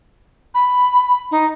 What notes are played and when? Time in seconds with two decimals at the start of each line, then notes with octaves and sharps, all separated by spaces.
0.54 B5
1.31 D#4